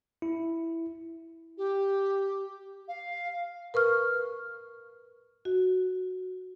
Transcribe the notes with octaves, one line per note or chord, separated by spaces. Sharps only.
E4
G4
F5
A#4 B4 C#6 F6
F#4